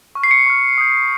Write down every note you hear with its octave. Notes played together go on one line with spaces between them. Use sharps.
C#6 F6
C7
C#7
C#6 F6
D#6 G6